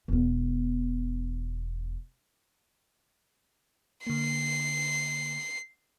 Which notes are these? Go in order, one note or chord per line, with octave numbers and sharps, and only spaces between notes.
E1 B3
D3 A#3 C7